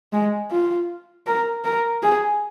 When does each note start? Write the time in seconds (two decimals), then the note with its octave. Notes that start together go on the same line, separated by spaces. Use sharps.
0.13 G#3
0.51 F4
1.27 A#4
1.64 A#4
2.03 G#4